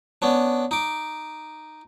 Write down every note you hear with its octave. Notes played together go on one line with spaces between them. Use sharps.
B3 C#4 D4
D#4 D6